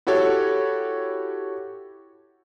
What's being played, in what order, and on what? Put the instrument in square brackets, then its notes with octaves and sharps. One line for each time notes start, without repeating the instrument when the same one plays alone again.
[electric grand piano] E4 F#4 G4 A4 C#5